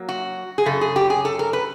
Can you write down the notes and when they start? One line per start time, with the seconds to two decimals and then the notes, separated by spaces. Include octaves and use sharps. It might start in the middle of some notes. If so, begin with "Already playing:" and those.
Already playing: F#3 A#3
0.09 F#4
0.58 G#4
0.66 F#2 C#3 A4
0.81 G#4
0.96 G4
1.10 G#4
1.25 A4
1.39 A#4
1.53 B4